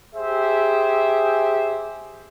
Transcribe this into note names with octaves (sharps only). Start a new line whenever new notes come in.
G4 G#4 C5 E5